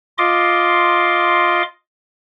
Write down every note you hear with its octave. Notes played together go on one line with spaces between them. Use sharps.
F4 D#5 C6 D6